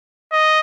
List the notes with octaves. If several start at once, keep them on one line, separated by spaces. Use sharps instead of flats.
D#5